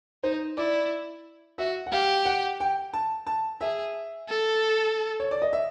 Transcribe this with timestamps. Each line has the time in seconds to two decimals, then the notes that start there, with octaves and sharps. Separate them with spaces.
0.23 D#4 C5
0.57 E4 D5
1.58 F#4 E5
1.86 F#5
1.92 G4 F5
2.26 F#5
2.60 G5
2.93 A5
3.27 A5
3.61 G#4 E5
4.29 A4
5.20 C#5
5.31 D5
5.42 D#5
5.53 E5